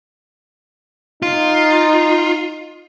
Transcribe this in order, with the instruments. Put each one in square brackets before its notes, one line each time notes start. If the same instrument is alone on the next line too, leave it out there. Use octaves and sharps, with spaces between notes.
[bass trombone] D#4 [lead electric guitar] F4